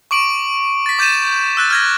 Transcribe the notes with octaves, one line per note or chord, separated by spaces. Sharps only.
C#6 D6 D7 F#7
A6 B6
D6 G6 A6 D#7 E7
E6 F#6 A6
F6 G#6 A#6